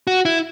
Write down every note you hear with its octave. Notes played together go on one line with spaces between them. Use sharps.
F#4
E4